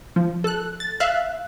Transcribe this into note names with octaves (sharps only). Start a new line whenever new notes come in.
F3
A4 F#6
A6
E5 F5 F#6